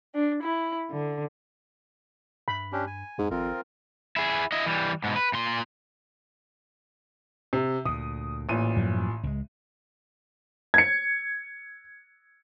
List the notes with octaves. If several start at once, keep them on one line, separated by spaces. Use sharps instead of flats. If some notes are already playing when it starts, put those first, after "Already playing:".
D4
E4
D3
G2 B5
C#4 D4 G4
G#5
F2 G#2
G#1 F2 C4 F4 A#4
E4 G#4
E4 D#5
E3 G3
G#2 B2
B4
A#2 C6
C3
D2 A#2 D#6
A1 A#2 D#7
F#2 F3 F#3
C#2 G#3
G#6 C#7